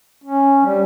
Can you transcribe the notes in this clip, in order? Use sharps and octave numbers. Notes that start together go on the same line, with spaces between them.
C#4
G3